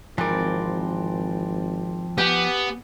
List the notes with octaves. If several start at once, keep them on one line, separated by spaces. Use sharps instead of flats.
G#1 E3 F3 C4 A#4 D5
B3 G4 G#5